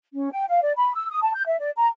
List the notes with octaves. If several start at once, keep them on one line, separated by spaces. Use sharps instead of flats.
C#4
G5
F5
D5
B5
E6
D#6
A5
G6
E5
D5
A#5